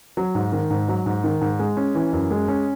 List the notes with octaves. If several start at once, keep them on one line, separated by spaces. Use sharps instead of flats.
F#3
G#2
D#3
G#2
F#3
G#2
D#3
G#2
G#3
C#4
E3
F#2
G#3
C#4